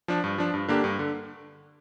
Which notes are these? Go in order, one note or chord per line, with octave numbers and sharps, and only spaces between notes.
F3 D4
G2
F3 D4
G2
D3 A#3 D4 G4
G2
D3